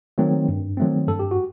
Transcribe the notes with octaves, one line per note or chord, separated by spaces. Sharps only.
D#3 F#3 A3 C4
G2
D#3 F#3 A3 C4
G2 A4
G4
F#4